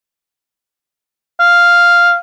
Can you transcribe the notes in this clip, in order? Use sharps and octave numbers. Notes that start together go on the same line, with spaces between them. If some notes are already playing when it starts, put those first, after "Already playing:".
F5